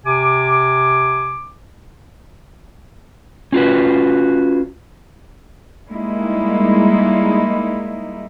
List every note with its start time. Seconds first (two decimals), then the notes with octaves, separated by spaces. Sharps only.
0.05 C3 G#5 D6
3.52 C#4 F4 F#4 B4
5.89 G3 G#3 A#3 D#4 E4